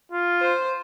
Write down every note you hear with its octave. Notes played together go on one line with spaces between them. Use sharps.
F4
C5